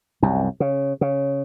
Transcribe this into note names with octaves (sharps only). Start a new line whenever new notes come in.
C2 F#2
C#3
C#3